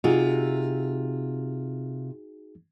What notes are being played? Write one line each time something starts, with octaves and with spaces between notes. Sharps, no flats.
C3 D#4 F4 F#4 G#4